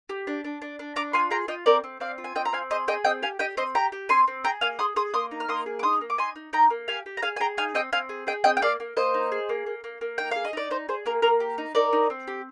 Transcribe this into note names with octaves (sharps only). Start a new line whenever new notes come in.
G4
D4
D4
D4
D4
D4 A#5 D6
F4 G#5 C6
G#4 G5 A#5
F4 D#5 G5
C4 A#4 D5
C4
C4 D5 F5
F4
G#5
C4 D#5 G5
A#5
C4 F5 G#5
G#4 C5 D#5
G#4 D#5 G5
C4 D#5 G5
G4 F5 G#5
G4 D#5 G5
C4 C5 D#5
G4 G5 A#5
G4
C4 G#5 C6
C4
G#4 G5 A#5
A#3 F5 G#5
G#4 C6 D#6
G#4 C6 D#6
A#3 C6 D#6
D#4
F6
A#3 C6 D#6
G#4
D6
D#4 C6 D#6
A#3
D6
D#4 G#5 C6
D#4
D#4 G5 A#5
A#3
G4 F5 G#5
G4
A#5
G#4 F5 G#5
G#5
G#4 G5 A#5
D#4 F5 G#5
C4 D#5 G5
C4 F5 G#5
G#4
G#4 D#5 G5
C4 D#5 G5
G5
A#3 D5 F5
A#3
A#3 C5 D#5
D#4
G#4
A#3
A#3
A#3
A#3
D#4 G5
G#4 F5
D#5
D#4 D5
D#4 C5
G#4 C5
A#3 A#4
A#3 A#4
G4
D#4
D#4 A#4 D5
D#4
C4
G4